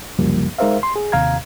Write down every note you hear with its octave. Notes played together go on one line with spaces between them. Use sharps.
C2 F#2 C#3 F3 G3 A#3
G#3 D#4 A#4 C5 E5 F5
C6
G#4
D#2 C3 F5 A#5 G#6